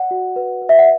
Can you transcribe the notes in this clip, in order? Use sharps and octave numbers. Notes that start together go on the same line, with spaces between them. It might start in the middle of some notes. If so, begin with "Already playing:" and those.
Already playing: D5 F#5
F#4
B4
B4
E5
F#5